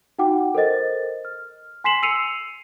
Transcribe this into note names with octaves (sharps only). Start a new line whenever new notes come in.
D#4 F#4 F#5 G5 D6
A4 A#4 C5 D#5 A6
F6
G#5 C6 B6 C7 E7 F#7
E6 C7 C#7 D#7 F7